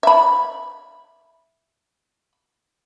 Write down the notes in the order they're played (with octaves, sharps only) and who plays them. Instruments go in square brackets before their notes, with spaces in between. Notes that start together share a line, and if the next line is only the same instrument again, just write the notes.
[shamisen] E5 B5